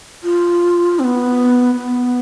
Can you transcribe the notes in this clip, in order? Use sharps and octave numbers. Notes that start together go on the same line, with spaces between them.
F4
C4
B3
B3